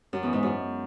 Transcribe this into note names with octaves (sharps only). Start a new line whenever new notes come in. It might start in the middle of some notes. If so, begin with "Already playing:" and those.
F#2
E2
G#2
F#2